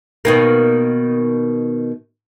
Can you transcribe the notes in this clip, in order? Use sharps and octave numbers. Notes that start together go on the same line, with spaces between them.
B2 D#3 A#3